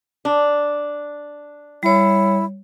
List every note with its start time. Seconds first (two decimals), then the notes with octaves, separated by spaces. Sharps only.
0.25 D4
1.83 G3 E4 C#5